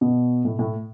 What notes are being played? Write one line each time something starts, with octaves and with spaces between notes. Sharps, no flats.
B2
A2
A2